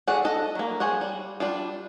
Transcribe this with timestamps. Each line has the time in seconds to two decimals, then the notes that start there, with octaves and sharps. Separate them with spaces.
0.07 F#4 G#4 A4 D5 F#5
0.25 A4 D#5
0.55 F#3 A#3
0.80 G#4 C5 C#5 F#5
1.01 G3
1.40 G3 D4 F4